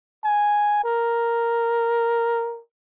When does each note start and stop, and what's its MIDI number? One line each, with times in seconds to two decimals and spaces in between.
0.24 0.82 80
0.84 2.60 70